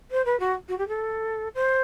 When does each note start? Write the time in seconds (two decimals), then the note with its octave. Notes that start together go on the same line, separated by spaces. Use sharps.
0.11 C5
0.25 B4
0.40 F#4
0.68 F#4
0.78 G4
0.88 A4
1.55 C5